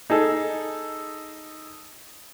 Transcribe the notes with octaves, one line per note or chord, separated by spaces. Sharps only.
D#4 G#4 A4